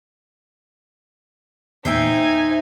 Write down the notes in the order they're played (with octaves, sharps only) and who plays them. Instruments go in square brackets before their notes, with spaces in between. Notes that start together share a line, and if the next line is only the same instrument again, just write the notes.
[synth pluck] E2 A#2 [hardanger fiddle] D#4 G#5 [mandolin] C5 E5 G5